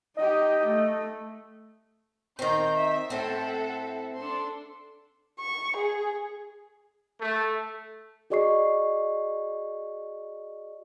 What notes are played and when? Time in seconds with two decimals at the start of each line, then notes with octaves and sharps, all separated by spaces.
0.17 D#4 G4 D#5
0.64 A3
2.39 D#3 C4 A#5 G6
2.79 E5
3.10 A2 C4 A4 E5 F#5
4.17 D4 A4 C6
5.39 C#6
5.77 G#4
7.20 A3
8.30 F#4 G#4 D5 D#5 C#6 C7